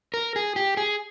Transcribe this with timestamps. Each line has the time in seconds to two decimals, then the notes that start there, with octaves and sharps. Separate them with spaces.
0.14 A#4
0.36 G#4
0.56 G4
0.77 G#4